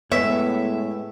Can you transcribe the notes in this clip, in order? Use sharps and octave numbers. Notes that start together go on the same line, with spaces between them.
A2 G#3 B3 B4 C#5 E5